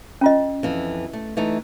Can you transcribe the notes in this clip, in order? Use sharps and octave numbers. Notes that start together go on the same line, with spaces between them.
C#4 F4 D#5
F2 E3
A3
E3 A3 D#4